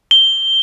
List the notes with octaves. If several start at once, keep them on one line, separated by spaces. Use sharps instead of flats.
G7